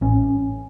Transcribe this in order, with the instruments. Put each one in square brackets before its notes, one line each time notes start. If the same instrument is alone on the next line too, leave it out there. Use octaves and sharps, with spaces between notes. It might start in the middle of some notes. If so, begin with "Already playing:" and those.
[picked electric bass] A1 C#4